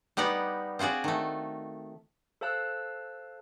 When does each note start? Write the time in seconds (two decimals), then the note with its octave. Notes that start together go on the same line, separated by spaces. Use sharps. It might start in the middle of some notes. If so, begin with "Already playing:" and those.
0.17 G3 B3 D#4 D5 F#5
0.79 C4 F4 F#4 G#4 D5
1.04 D#3 A3
2.41 A4 C5 F5 A5 E6 F#6